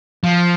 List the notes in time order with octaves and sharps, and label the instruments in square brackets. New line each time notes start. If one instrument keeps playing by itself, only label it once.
[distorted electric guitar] F3